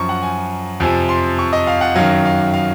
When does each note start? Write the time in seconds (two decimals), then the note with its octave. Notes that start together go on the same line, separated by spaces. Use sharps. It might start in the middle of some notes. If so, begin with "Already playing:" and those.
Already playing: F#2 F3 A#5 C#6
0.09 F#5
0.22 G#5
0.80 F2 C3 F3 G#5
1.09 C6
1.39 C#6
1.53 D#5
1.67 F5
1.81 F#5
1.96 F#2 D#3 F#3 F5
2.25 F5
2.54 F5